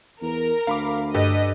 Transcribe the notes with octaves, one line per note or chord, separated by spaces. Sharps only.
E2 A#4
D2 F5 B5 D6
G2 G4 A4 B4 D#5